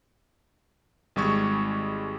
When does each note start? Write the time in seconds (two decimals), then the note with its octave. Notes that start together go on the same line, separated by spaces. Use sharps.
1.16 G#1 G3 G#3 C#6 G#6